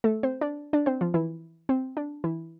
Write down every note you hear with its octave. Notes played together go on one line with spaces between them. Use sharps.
A3 A4
C4 C5
D4 D5
D4 D5
C4 C5
F3 F4
E3 E4
C4
D4
E3 E4